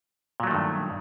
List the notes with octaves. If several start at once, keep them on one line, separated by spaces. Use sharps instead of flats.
G2 A#2 D#3 F#3 A3